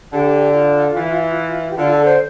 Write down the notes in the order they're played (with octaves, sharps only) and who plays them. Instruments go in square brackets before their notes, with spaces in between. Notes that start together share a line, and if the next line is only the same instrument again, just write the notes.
[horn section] D3 [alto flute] G4
[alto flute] F4
[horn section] E3
[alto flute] G4
[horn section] D3 [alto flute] F4
[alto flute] A4
C5